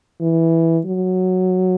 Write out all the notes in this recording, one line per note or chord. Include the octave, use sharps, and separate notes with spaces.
E3
F#3